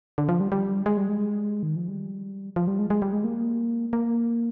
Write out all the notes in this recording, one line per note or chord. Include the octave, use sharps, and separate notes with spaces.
D3
F3
G3
G3
G#3
G3
G#3
D#3
F3
G3
F3
G3
G#3
G#3
G3
G#3
A#3
A#3